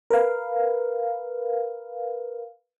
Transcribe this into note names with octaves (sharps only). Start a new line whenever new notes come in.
A#4 B4 F5